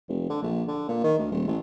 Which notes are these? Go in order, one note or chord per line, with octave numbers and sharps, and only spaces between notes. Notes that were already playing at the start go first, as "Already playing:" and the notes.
F1
D3
A#1
D3
A#2
D#3
D2
D#1
A1